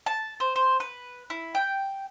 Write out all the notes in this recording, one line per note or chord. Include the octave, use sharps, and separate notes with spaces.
A5
C5
C5
B4
E4
G5